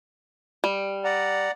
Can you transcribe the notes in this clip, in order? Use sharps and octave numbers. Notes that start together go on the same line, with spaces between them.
G3
D5 F#5 A#5